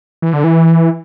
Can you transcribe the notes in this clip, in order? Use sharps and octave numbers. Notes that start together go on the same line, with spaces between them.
E3
D3
E3